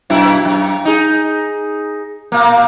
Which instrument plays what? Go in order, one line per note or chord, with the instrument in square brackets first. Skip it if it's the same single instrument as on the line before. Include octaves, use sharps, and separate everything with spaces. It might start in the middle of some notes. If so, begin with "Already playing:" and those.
[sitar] F#2 B2 E4
F#2
D#4 G#4
A#2 A#3